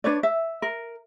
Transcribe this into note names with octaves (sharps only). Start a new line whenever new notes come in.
D4 B4 C#5 D5
E5
A#4